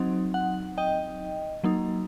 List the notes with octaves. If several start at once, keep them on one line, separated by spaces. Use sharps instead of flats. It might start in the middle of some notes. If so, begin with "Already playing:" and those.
Already playing: F#3 C4 D#4
F#5
D#5 G5
F#3 A#3 D#4